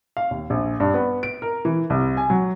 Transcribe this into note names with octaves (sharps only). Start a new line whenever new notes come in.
F5
D#2
A#1
G2
B3
D7
A#4
E3
C2
G#5
F#3